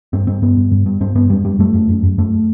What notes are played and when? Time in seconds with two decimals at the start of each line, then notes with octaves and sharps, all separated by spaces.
0.13 G2 C4
0.27 G2 C4
0.42 G2 B3
0.57 G2
0.72 G2
0.86 G2
1.00 G2 C4
1.15 G2 B3
1.30 F#2 G3
1.45 F#2 G3
1.59 F#2 A3
1.74 F#2
1.89 F#2
2.03 F#2
2.18 F#2 A3